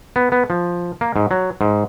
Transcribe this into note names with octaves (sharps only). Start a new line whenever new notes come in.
B3
B3
F3
A#3
G#2
F#3
G#2